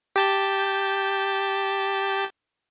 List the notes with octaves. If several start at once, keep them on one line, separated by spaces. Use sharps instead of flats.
G4 A5 G6